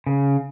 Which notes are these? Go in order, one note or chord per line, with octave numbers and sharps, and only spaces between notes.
C#3